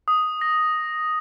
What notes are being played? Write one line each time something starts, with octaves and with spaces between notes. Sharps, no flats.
D#6
A#6